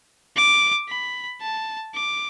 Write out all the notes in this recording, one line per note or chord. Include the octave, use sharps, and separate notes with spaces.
D6
B5
A5
D6